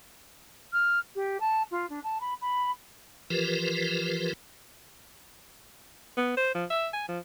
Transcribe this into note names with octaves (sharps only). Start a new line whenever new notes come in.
F6
G4
A5
F4
D4
A5
B5
B5
E3 F3 F4 G4 A#4 B4
B3
C5
F3
E5
G#5
F3